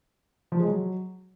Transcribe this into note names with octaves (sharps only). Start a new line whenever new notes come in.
F3
G#3
F#3